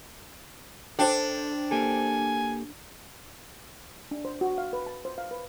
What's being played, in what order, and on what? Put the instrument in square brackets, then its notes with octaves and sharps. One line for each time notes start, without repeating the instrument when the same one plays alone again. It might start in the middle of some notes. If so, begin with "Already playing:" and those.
[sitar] D4 [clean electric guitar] A4 [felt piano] C5 G5
[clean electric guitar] A#3 G4 A4 [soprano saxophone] G#5
[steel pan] D4
C5
F#4
F5
B4
A5
C5
F5
B4